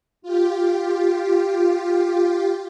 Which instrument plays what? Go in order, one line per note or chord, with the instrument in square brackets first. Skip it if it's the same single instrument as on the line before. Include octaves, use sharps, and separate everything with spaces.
[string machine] F4 G4